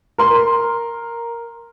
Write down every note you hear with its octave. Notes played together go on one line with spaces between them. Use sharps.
A#4 C6